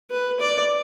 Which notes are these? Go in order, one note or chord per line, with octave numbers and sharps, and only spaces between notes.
B4
D5